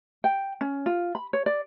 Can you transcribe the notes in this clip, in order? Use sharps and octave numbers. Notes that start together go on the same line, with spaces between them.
G5
C#4
F4
B5
C#5
D5